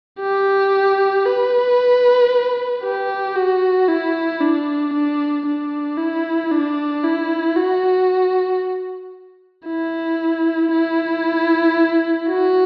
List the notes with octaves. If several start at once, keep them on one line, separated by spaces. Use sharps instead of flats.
G4
B4
G4
F#4
E4
D4
D4
D4
E4
D4
E4
F#4
E4
E4
F#4